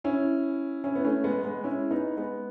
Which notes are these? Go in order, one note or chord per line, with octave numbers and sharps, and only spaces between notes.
C#4 E4
C#4 E4
B3
A3 C#4
G#3 B3
G#3 B3
C#4 E4
B3 D#4
G#3 B3